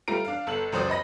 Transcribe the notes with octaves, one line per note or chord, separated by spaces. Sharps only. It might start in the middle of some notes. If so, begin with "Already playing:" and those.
G3 A3 F4 A#5 D7
D4 F5
G1 A4 F#7
C#2 F#2 C5 D5 D#6
D#5 B5 A#6